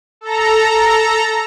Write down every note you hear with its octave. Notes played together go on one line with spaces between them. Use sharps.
A4 A#5